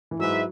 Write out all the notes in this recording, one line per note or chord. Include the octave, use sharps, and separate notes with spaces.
E3
G#2 F#3 G#3 E4 B4 E5